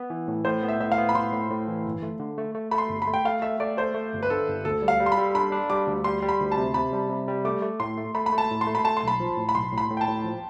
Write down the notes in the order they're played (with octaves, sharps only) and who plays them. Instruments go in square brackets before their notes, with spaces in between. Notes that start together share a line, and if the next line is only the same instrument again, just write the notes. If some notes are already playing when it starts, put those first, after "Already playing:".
Already playing: [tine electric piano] B3
E3
A2
[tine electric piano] A2 [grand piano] C5
[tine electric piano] B3
[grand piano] E5
[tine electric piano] A2 [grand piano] E5
[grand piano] F5
[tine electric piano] B3
[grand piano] B5
[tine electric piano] A2 [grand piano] C6
[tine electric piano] A2
A2
E3
G1
A3
D3
A3
A3
[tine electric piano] A3 [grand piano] B5
[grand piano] C6
[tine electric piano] G1
[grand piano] B5
[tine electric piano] A3
[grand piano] G5
[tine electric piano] A3 [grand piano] F5
[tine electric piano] A3 [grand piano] E5
[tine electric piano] A3 [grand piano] D5
[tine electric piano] A3 [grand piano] C5
[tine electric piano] A3
G1
[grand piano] B4
[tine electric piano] D3 [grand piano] A4
[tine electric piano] G1
[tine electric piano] D2 [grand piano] A4
[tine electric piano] G3
[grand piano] F5
[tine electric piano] G3
[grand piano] C6
B5
[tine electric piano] G3
[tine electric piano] D4 [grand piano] B5
[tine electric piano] D4
[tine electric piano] G3 [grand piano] D6
[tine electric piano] D2
[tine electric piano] G3 [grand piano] C6
[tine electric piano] G3
[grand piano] B5
[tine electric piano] D2
[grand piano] A5
[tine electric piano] C3
[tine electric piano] C3 [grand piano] B5
[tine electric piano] G3
C3
G3
[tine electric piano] A3 [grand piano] D6
[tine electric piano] A3
[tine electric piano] A2 [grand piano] C6
[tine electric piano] A3
[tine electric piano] A3 [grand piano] B5
[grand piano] B5
[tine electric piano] A3
[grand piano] A5
[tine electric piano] A2
[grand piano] C6
[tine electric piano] A3
[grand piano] B5
[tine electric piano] A3 [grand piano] A5
[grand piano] C6
[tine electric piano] B1 [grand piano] B5
[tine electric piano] F3
A2
[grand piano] B5
[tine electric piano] B1 [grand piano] C6
[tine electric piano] A2
[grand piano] B5
[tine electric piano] A2
[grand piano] G5
A5
[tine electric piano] A2
F3